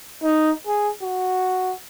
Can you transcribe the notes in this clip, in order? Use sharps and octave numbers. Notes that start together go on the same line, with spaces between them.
D#4
G#4
F#4